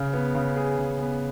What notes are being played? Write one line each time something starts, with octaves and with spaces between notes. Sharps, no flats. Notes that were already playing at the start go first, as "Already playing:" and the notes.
Already playing: C#3
B3
C#3
G#4
C#3
B3